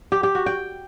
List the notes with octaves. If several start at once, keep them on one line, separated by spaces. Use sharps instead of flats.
G4
G4
F#4
G5